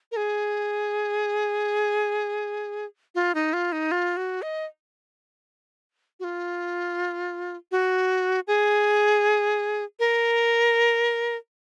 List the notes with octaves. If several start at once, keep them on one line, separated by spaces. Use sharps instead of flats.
A#4
G#4
F4
D#4
F4
D#4
F4
F#4
D#5
F#4
F4
F#4
G#4
A#4